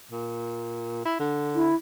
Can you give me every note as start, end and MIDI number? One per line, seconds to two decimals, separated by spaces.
0.11 1.02 46
1.05 1.17 64
1.20 1.70 50
1.55 1.75 64